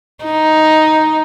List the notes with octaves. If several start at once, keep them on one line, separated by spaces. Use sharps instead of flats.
D#4